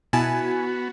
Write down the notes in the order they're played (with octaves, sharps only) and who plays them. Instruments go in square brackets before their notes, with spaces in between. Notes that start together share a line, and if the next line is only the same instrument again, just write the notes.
[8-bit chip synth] B2 A5 [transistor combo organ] B3 [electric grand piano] E4 G#5 [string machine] F#4